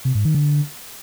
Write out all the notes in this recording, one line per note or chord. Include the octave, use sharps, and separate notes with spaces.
C3
G#2
D#3
D3